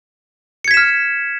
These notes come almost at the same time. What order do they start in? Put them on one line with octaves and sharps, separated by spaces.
C#7 G#6 B6 E7 F6